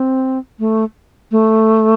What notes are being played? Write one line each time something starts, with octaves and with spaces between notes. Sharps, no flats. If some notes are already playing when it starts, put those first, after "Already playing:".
Already playing: C4
A3
A3